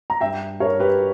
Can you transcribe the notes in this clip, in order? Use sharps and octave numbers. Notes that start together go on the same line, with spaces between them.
A#5
G2 E5 G5
G2 A#4 C#5
G4 B4